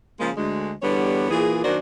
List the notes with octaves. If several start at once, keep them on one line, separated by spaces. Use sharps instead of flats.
C#3 F3 G#3 A#3
D2 G#3
E2 G2 D3 G3 B3 C#5
A#2 E3 G#4
F#2 D#3 A#3 D4 F#4 C5